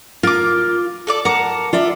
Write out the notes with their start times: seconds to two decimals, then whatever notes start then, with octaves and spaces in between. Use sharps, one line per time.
0.23 F4 A#4 D6
1.07 A4 D5 D6
1.25 A#4 F#5 A5 D6
1.73 F4 D5 E5